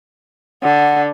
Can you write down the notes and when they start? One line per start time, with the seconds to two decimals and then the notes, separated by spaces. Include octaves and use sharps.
0.63 D3 F#5